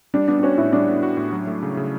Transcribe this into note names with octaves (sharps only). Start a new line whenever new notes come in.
G3 D4
B3 D4
D4
C#4 F#4
A2 E4
G3 D4
B3
F#4
A2
F#3
A3
C#3
C#3